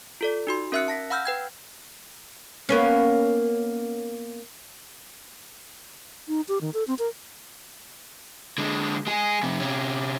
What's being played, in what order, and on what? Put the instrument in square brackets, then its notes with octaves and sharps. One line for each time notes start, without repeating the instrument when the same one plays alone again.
[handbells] F4 A4 D5
D#4 F#4 C6
C#4 A#4 E5 E6 F#6 C#7
A5 A#6 B6
F5 F#5 B5 E6 F6 G6
B4 G5 G#6
[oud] A#3 B3 C#4
[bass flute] D#4
G4
D#3
A4
C4
A#4
[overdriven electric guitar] D3 G#3
G#3 G#4
F2 C3
C3 C#4